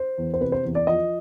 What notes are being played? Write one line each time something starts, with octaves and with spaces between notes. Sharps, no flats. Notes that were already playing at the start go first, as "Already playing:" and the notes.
Already playing: C5
E2
C5
C3 B4
C5
E2
D5
F3 D#5